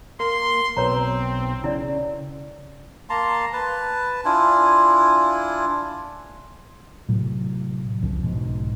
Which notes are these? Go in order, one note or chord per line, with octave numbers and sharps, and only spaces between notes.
A#3 C6
B1 C4 B4 C#5 A#5
C#3 E4 D5
A#3 A5 A#5 C6
B4 A5
D4 E4 F4 G#5
A2 C3 F#3
F1 C2 C#3 F3
B1 G#2 B2